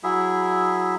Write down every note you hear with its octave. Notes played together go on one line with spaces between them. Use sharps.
F#3 E4 G#4 E5